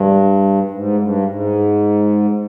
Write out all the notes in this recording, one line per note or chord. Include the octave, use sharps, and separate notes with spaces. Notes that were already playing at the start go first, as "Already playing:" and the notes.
Already playing: G2
G#2
G2
G#2